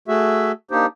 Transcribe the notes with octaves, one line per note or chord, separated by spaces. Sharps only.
A3 F#4 G#4 E5
A#3 D4 D#4 G4 C5